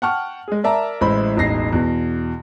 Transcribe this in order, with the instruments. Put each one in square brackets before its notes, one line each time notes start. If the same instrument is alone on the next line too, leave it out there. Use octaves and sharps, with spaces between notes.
[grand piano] F#5 G5 A5 C#6 F6
G#3 G#4
A#4 D5 E5 A5 A#5
A1 G#3 E4 C5 B5
E1 A1 D#4 A#6 C7
E2 B2